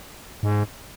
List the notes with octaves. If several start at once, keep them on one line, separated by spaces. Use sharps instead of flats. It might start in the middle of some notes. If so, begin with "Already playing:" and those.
G#2